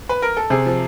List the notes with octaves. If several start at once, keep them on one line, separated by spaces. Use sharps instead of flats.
B4
A#4
A4
C3 G#4
F3